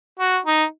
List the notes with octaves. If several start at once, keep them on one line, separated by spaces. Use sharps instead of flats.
F#4
D#4